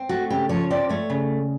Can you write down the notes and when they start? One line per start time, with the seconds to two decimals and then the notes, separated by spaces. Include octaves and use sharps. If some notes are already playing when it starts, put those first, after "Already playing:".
Already playing: C4
0.09 A3 F#4
0.30 C#3 G4
0.49 F3 C#5
0.70 C4 D5
0.89 A3 C#5
1.10 C#3